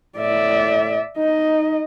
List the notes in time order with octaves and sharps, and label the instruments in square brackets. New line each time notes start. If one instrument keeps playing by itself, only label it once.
[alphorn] A2 [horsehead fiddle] D5 E5
[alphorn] D#4 [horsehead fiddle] D#5